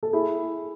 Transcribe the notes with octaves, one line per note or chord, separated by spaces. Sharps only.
A4
E4 G#4